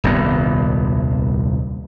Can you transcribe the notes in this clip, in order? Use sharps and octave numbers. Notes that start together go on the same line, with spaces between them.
D#1 C2 G2 B3